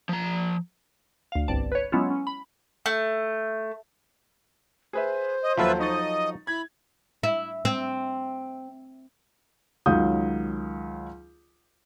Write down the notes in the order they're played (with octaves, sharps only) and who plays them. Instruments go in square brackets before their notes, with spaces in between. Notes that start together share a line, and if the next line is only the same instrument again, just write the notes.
[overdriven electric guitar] F3 A#5
[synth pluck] D2 F5
G1 C2 G2 D5 A5
B4 C#5
F#3 G#3 B3 C#4 E4 F4
C#4
B5
[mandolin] A3
[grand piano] G#4 B4 E5 [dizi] C5
[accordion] D#5
[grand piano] D#2 [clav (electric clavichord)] F3 F#3 A4 [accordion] F4 B4 E5
[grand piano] D#4 C#6 A6 [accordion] D#5
[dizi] E4 [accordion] B5 [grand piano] G#6
[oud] E4
C4
[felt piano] C#2 D#3 F#3 F5 D#6 G6